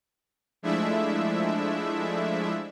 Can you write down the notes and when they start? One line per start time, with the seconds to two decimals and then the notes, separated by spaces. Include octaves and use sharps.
0.62 F3 G#3 A3 D4 E4 E5